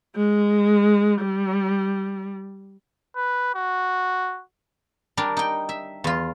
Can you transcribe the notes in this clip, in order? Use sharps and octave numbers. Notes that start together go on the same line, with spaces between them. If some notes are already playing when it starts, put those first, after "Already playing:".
G#3
G3
B4
F#4
G3 D4 A#4
D#4 G5
E5
E2 F4